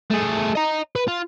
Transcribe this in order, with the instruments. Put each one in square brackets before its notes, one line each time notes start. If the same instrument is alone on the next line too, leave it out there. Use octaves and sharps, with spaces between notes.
[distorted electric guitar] A3 G#4
D#5 A#5
B4
F4